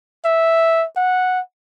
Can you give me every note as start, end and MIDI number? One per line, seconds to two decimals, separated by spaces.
0.25 0.86 76
0.96 1.40 78